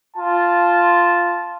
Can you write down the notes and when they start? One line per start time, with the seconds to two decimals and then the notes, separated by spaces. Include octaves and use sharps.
0.17 F4 A5